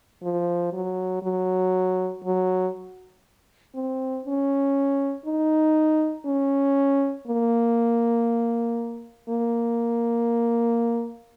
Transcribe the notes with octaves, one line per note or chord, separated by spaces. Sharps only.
F3
F#3
F#3
F#3
C4
C#4
D#4
C#4
A#3
A#3